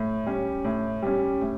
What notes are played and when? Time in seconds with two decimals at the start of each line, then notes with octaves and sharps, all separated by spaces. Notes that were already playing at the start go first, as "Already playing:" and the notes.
Already playing: A2
0.26 G3 C#4
0.65 A2
1.02 G3 C#4
1.41 A2